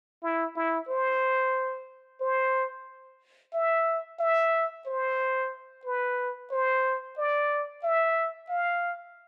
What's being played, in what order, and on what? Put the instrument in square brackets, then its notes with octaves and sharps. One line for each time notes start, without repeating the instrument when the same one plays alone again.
[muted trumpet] E4
E4
C5
C5
E5
E5
C5
B4
C5
D5
E5
F5